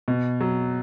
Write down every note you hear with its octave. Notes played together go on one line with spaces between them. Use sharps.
B2
F#3